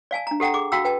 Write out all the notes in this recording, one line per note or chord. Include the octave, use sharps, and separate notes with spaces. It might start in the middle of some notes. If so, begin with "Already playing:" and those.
D5 F5 G#5 A5
D4 A#5
G4 A4 F#5 G5 A#5
G#4 D6
F#4 F5 G5 A#5 E6
B4 G5 A5